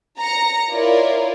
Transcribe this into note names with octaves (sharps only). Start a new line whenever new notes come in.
A#5 A#6 C#7
E4 F4 A#4 C#5 D5